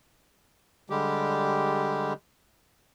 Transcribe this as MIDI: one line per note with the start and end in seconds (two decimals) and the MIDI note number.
0.90 2.13 50
0.90 2.13 55
0.90 2.13 56
0.90 2.13 67